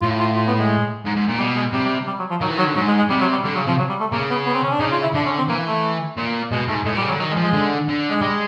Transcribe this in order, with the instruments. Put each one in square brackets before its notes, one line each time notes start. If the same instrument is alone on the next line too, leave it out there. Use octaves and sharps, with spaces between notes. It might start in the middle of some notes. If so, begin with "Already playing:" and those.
[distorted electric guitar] A2 [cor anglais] F4
[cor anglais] F4
F4
B3
G#3
[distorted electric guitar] G#2
G#2
A#2
[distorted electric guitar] B2 [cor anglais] G3
[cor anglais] G#3
[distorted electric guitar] C3 [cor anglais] G3
[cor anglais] G3
G3
F#3
F3
[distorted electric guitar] D#3 [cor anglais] F#3
[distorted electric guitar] E3
[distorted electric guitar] D#3 [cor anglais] F#3
[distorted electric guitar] D3
[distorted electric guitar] G#2 [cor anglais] F#3
[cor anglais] G#3
G#3
[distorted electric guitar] C3 [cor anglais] G3
[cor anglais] F#3
G3
[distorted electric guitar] D3 [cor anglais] G3
[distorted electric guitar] C#3 [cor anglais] F#3
[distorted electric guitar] C3 [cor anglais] F3
[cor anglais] F#3
G3
A3
[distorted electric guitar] C#3 [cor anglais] A#3
[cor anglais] B3
B3
C4
C#4
D4
[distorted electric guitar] C#3 [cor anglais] D#4
[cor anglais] F4
E4
[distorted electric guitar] D3 [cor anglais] D4
[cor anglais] C#4
C4
[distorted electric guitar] E3 [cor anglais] A#3
[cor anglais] A3
[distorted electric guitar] A#2
[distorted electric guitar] B2 [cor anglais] G#3
[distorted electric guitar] G#2 [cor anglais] A3
[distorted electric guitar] A2 [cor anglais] G#3
[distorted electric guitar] A#2
[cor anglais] G3
[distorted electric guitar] C#3
[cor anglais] F#3
[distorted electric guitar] D3
[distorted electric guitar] D#3 [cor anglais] F#3
[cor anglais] G#3
[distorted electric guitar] F3
[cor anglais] G#3
[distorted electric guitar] D3
D3
[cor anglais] G#3
[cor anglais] G3 [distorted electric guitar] G#3